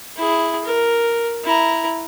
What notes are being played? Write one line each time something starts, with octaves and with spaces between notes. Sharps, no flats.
E4 G#4
A#4
E4 A#5